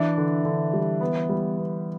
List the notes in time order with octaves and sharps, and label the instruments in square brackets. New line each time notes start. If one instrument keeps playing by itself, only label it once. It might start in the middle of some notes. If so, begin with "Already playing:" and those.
Already playing: [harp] E3 [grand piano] D4
[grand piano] D3
D3
G3
B3
G3
B3